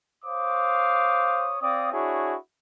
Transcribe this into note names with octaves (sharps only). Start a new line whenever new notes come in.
C5 C#5 F5 D6 D#6
C4 D5 F5 D#6
D4 E4 F#4 G#4 C#5